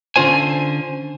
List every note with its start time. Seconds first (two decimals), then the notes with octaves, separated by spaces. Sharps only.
0.16 D3 C#4 F4 C5 G#5